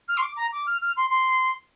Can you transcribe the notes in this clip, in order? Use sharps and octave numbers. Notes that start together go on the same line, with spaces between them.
F6
C6
D6
A#5
D6
F6
F6
C6
C6